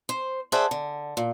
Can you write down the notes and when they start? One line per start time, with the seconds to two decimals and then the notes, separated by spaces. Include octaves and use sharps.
0.09 C5
0.52 G#4 C5 D5 E5 F#5 A5
0.71 D3
1.17 A#2